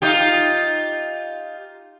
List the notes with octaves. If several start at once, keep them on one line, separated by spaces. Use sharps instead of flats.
D#4 F4 G4